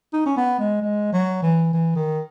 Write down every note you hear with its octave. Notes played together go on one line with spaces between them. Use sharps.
D#4
C#4
B3
G#3
G#3
F#3
E3
E3
D#3